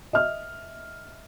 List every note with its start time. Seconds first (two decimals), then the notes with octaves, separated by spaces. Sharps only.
0.13 D#5 E5 F6